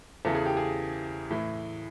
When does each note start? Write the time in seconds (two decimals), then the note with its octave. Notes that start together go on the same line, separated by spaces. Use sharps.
0.25 E2 C#3 E3 A4
0.35 G#4
0.45 G4
0.57 G#4
1.31 A2 E3